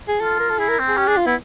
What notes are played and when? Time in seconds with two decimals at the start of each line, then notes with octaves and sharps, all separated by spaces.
0.08 G#4
0.21 F4 A4
0.40 A#4
0.50 A4
0.59 E4 G#4
0.69 A#4
0.79 C4
0.88 G#4
0.97 C#4 G4
1.07 D4 G#4
1.17 F4
1.27 B3 E4